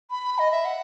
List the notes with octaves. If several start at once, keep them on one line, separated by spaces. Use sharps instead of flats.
B5
D#5
E5
F#5